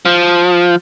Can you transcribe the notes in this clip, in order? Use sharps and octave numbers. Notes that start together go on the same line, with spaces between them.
F3